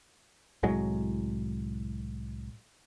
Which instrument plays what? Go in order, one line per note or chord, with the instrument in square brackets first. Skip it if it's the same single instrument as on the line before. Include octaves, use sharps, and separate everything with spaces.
[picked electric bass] C2 A2 F#3 G#3